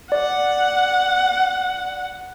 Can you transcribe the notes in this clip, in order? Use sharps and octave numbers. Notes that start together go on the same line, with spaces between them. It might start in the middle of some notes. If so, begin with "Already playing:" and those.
D5 F#5